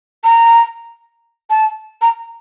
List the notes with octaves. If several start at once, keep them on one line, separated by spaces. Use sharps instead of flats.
A#5
A5
A#5